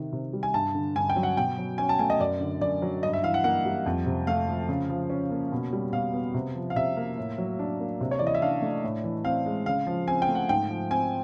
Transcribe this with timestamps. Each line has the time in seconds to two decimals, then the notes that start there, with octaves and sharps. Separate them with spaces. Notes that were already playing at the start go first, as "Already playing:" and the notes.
Already playing: C3 D#3
0.12 C3
0.33 G3
0.43 G#5
0.54 G2 A5
0.75 D3
0.96 G2 G#5
1.10 G5
1.16 F#3
1.23 F#5
1.37 B2 G5
1.58 F#3
1.78 C#4 G#5
1.89 A5
1.99 A3 G#5
2.10 D#5
2.20 F#2 D5
2.40 D3
2.61 F#2 D5
2.82 F#3
3.03 G2 D#5
3.13 E5
3.23 E3 F5
3.34 F#5
3.44 A#3 F#5
3.65 G3
3.86 F2
4.06 C3
4.27 A3 F5
4.48 F3
4.69 C#3
4.89 F3
5.10 C#4
5.31 A#3
5.52 B2
5.73 G3
5.93 B2 F5
6.14 B3
6.34 C3
6.55 F3
6.70 F5
6.76 C3 E5
6.97 A#3
7.17 A2
7.38 F#3
7.59 D4
7.80 A#3
8.01 C3
8.11 C#5
8.19 E3 D5
8.27 D#5
8.35 E5
8.42 D4 F5
8.62 A3
8.84 A2
9.04 E3
9.25 C4 F5
9.46 G#3
9.66 C#3 F5
9.87 F3
10.07 C4 G#5
10.22 G5
10.29 A3
10.35 F#5
10.49 G#2 G5
10.70 F3
10.91 C4 G#5